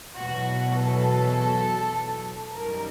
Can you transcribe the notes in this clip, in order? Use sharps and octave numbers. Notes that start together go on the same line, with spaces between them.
E2 B2 F#3 F#4
A4
F#2 D#3 G3 A#4